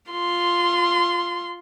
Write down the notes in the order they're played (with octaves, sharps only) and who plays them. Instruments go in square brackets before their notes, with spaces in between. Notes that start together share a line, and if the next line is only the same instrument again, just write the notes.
[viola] F4 C6